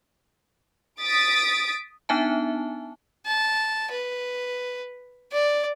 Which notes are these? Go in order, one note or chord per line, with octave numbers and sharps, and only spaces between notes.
D#6 A6 B6 D7
B3 D4 D#4 E5 G#5 A5
A5
B4
D5